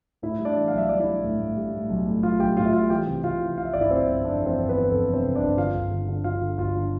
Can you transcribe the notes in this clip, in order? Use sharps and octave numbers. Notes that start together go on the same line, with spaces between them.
A2 E4 E5
G3
D4 D5
E3
F5
B1 E5
G3 D5
E4 E5
G3
A2
A2
G3
A2
B1
A2
B1 F4 F5
B1 G4 G5
A2 F4 F5
E5
G3 F4 F5
E3 G4 G5
C3
C3 F4 F5
E3
E3 F5
E5
G1 D5
E4 E5
G1 C4 C5
G1
F2 D4 D5
E3
C4 C5
G1
E3 B3 B4
F2 A4
C3
C4 C5
C3
D4 D5
G1
D3 F4 F5
G1
D3
D3
D3 F4 F5
D3
G1 F4 F5
D3